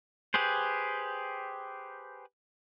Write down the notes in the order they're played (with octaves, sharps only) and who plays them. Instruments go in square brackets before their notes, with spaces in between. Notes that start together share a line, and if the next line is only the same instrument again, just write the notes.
[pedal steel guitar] G4 G#4 B4 C5